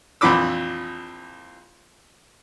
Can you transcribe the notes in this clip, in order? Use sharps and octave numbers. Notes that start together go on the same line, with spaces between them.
A#1 F2 E3 B5 D6 E6